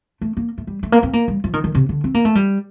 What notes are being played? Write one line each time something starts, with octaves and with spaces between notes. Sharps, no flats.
A3
A#3
A3
G3
A3
A#3
C4
A#3
G3
F3
D#3
D#3
C3
D3
C4
A#3
A3
G3